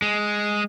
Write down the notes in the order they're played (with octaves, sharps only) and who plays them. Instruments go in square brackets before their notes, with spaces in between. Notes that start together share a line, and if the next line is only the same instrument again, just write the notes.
[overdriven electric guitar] G#3